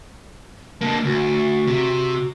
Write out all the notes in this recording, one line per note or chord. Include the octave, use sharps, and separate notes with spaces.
D3 A#3 A5
D2 F#4
C3